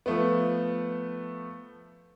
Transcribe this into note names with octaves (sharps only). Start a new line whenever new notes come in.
F3 A3 B3